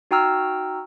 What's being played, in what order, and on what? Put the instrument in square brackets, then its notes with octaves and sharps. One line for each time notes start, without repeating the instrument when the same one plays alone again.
[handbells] D#4 F#4 G5 A#5 E6 F6